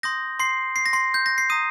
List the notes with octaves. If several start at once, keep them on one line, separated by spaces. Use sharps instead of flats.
C6 D#6 G6 A#6
C6 C7
C7
A#6
C6 C7
G6
A#6
C7
A#5 D#6 G6 D#7